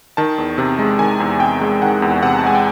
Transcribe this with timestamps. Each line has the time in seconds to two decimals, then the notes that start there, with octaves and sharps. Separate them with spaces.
0.17 D#3 A5
0.38 E2
0.58 C3
0.79 G#3
0.99 D#3 G#5
1.20 E2
1.40 C3 G5
1.61 G#3
1.82 D#3 F#5
2.02 E2
2.23 C3 F#5
2.38 A5
2.43 G#3 G#5
2.55 G5